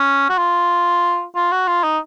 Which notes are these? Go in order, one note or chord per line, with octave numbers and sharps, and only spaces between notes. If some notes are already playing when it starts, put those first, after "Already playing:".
Already playing: C#4
F#4
F4
F4
F#4
F4
D#4